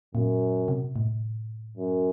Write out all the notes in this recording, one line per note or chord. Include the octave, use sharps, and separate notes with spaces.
F#2 A#2
C3
A2
F#2